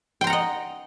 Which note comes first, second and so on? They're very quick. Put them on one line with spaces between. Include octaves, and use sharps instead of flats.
G5 C6 A#5 F#5 D#5